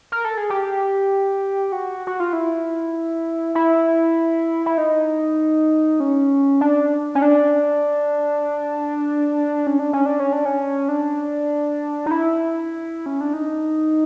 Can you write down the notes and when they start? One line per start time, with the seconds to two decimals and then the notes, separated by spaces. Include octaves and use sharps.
0.12 A#4
0.25 A4
0.37 G#4
0.50 G4
1.72 F#4
2.07 F#4
2.20 F4
2.33 E4
3.55 E4
4.66 E4
4.78 D#4
6.00 C#4
6.61 D4
7.15 C#4
7.22 D4
9.67 C#4
9.79 D4
9.93 C#4
10.06 D4
10.20 C#4
10.33 D4
10.45 C#4
10.89 D4
12.06 D#4
12.11 E4
13.06 C#4
13.21 D4
13.34 D#4